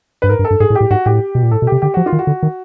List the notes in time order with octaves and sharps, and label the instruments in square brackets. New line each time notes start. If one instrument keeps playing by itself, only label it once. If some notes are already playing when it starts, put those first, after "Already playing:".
[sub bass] G2 [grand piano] B4
[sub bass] G#2 [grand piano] A#4
[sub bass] G2
[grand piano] A4
[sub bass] G2
[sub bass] G#2 [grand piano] G#4
[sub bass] A2
[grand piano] G4
[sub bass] A2
[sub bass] G#2 [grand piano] F#4
[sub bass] A2 [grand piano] G4
[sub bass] B2
A#2
[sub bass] A2 [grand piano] A4
[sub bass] B2
[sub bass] C3 [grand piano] G4
[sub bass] D3 [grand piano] G4
[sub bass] F3 [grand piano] F#4
[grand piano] F4
[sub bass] D#3
[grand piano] F#4
[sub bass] D3
D#3